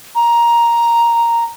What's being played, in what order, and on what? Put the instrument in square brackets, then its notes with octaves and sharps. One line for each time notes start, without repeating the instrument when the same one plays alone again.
[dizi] A#5